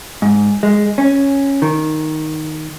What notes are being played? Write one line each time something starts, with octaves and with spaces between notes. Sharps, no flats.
G#2
G#3
C#4
D#3